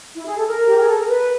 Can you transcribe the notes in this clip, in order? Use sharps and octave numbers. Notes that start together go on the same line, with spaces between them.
E4
G#4
A4
A#4
G4
G#4
A4
A#4
B4